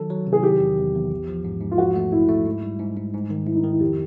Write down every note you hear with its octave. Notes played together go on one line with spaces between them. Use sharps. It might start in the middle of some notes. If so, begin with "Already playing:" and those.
Already playing: D#3 F#3 A4
F#3
C3
G#4
D#3 G4
E2
E2
E2
A#1
F3
G#2
G#2
F4
F3 F#4
A3
A#1 E4
A3
G#2
G3
G#2
G#2
G#2
D#3
G#2 E4
D#4
D#3
E4
F2 G4